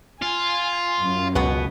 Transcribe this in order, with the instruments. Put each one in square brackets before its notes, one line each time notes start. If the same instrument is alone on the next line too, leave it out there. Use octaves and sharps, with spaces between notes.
[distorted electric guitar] F4 [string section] G#5
[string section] F#2
[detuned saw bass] C#2 [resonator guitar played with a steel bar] B2 B3